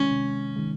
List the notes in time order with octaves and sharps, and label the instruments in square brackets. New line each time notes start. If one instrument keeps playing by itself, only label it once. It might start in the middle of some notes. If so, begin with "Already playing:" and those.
Already playing: [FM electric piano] C3 D#3 G#3 [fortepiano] C#4
[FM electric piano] C3
D#3 G#3